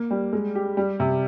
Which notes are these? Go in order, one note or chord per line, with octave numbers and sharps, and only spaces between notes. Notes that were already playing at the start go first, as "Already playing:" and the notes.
Already playing: A#3
G3
G#3
G4
G3
C3